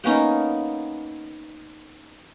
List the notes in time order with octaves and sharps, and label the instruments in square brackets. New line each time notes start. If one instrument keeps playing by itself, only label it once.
[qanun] A#3 B3 C#4 D#4